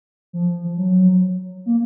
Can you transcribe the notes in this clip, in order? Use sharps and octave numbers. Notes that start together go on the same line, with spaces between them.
F3
F#3
A#3